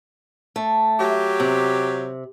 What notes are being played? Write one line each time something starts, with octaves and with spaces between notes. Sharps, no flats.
A3
F#3 G4
C3